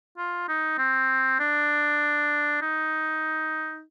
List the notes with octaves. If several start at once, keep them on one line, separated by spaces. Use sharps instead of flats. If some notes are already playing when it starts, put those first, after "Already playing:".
F4
D#4
C4
D4
D#4